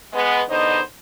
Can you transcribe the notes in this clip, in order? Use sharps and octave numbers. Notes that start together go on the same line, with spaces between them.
G#3 B3
E2 D3 B3 D#4 C5 D#5